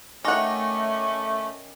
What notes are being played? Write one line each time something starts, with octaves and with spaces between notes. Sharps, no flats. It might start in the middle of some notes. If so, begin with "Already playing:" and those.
D#3 A3 C#4 F#5 G#5 D6 A#6